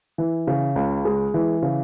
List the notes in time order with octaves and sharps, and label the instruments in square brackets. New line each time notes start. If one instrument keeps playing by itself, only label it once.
[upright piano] E3
C#3
C#2
G#3
E3
C#3